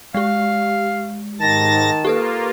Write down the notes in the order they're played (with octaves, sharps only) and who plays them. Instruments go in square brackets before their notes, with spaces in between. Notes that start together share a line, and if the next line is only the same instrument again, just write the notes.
[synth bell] G#3 G4 [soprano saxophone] F5
[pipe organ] G#2 A6 A#6 [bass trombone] D#3 [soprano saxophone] A5
[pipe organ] A#3 F4 [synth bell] G4 A4 B4